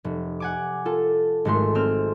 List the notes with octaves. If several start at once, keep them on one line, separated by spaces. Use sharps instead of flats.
F1
F#5 G#5 D6
F4 A4
G#1 G#3 A3 C6
C4 F6